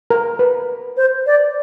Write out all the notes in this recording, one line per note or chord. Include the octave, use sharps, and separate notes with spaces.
A#4
B4
C5
D5